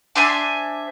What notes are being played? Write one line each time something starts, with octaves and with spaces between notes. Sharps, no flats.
D4 C5 E5 G#5